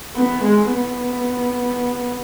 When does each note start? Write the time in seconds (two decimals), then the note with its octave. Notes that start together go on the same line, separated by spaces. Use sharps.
0.16 B3
0.44 G#3
0.73 B3